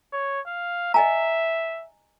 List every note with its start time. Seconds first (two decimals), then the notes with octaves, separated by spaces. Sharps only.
0.13 C#5
0.46 F5
0.94 D#5 E5 G#5 A#5